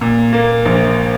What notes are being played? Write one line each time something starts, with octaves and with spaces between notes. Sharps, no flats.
A#2
A#3
A#1